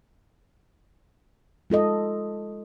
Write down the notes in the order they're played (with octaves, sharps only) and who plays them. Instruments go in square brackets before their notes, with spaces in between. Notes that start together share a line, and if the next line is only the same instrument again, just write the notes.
[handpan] G#3 F4 A4 D#5